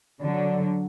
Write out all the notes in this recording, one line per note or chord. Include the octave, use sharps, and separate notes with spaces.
D3 F#3